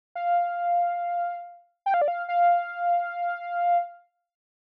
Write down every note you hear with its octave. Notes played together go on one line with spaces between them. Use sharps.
F5
G5
F5
D5
F5
F5